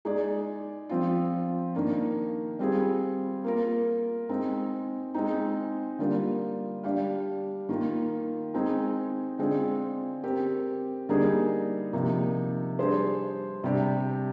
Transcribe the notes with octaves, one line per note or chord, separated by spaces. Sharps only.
G#3 D#4 G#4 D5
F3 C4 F4
D#3 A#3 D4
G3 C4 F4 G#4
A#3 F4 A#4
G#3 C4 D#4
G#3 C4 D#4
D3 G3 A#3 F4
G3 D4 G4 D5 F5
D#3 A#3 F4
G#3 C4 D#4 G#4
D3 G#3 C4 F4 G#4
C4 G4 A#4
D3 G3 A#3 D#4 G#4
C3 F3 A#3 D#4
G3 D4 G#4 C5
C3 G3 D4 G4 D5